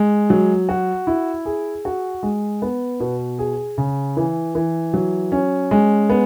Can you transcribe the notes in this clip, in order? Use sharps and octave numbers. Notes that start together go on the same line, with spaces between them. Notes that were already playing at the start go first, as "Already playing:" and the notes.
Already playing: G#3
F#3
F#4
E4
G#4
F#4
G#3
B3
B2
G#4
C#3
E3
E3
F#3
C#4
G#3
B3